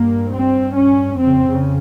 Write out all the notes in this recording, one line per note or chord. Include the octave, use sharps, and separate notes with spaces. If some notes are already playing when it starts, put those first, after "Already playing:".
Already playing: G2 A#3
C4
C#4
F2 C#3 C4
C#3